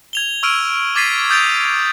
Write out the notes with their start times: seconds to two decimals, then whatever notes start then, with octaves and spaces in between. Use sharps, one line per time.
0.13 G#6 F7 G7
0.43 C#6 E6 F6 D7 D#7
0.95 D6 G#6 A6 B6 C7 D#7
1.30 D#6 G6 A6 D7 F7